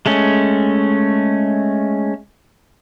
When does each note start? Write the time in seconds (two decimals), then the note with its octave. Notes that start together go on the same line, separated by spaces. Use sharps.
0.06 G#3 A3 C#4